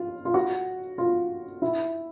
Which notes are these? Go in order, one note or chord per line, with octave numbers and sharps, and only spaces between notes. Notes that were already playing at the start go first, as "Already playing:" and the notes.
Already playing: F4
F4
F#4
F4
E4